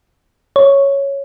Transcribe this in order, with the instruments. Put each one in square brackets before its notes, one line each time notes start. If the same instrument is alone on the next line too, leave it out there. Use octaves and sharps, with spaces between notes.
[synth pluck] C#5